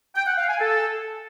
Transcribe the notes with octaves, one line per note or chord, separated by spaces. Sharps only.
G5
F#5
F5
G#5
A4